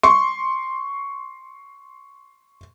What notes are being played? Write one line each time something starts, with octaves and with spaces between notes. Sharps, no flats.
C6 C#6